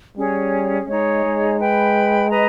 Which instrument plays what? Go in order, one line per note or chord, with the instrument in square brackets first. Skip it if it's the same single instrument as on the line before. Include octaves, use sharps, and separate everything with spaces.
[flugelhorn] G3 [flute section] C#4 G#4 C#5
[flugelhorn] G#3 [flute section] D#4 G#4 C#5
[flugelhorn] G#3
[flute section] B4 G5 B5
B4 D#5 A#5